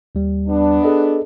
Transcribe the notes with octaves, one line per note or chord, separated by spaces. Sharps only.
D#2 G3
B3 D4
G#4 A4 D#5